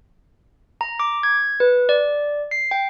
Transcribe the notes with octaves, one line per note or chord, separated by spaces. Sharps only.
A#5
D6
G#6
B4
D5
C7
G5